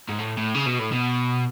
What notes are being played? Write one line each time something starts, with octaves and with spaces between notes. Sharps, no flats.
G#2
A2
A2
C#3
B2
A2
B2